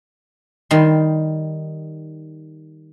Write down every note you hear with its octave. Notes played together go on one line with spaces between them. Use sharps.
D#3 G3 C6